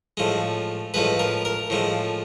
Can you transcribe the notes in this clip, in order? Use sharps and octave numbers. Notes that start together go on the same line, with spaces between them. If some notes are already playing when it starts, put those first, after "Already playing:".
A2 F3 G#3
A2 F3 G#3 B4
A#4
A#4
A2 F3 G#3